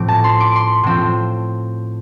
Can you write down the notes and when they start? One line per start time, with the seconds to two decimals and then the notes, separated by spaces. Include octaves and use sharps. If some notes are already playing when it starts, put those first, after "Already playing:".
Already playing: A2 F3 A3 C4 D6
0.08 A5
0.24 C6
0.40 D6
0.56 C6
0.84 A2 F3 C4